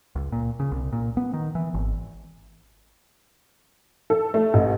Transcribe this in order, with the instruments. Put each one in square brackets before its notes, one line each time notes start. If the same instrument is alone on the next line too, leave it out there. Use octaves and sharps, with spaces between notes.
[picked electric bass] C#2
A#2
C#3
C2
A#2
B3
D#3
E3
G#1
[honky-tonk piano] A4
A3
A1